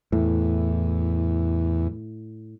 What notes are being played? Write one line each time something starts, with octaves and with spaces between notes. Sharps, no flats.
E2 A2